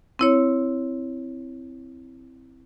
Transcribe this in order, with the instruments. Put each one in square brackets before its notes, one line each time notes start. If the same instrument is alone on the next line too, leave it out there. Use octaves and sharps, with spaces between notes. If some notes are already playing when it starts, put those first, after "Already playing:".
[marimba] C4 E4 C#5